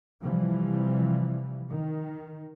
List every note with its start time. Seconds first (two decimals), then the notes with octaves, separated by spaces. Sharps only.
0.20 C3 E3 F3 G3
1.69 D#3